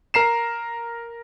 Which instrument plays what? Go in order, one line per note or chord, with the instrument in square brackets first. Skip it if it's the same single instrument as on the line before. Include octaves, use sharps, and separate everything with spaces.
[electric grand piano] A#4 A#5 C7 E7